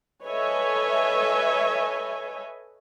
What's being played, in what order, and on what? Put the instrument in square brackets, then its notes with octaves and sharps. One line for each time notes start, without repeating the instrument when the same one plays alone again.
[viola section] A4 B4 C#5 D#5 E5 G#5